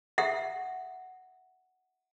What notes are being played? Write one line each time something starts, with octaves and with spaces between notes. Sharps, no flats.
E5 F#5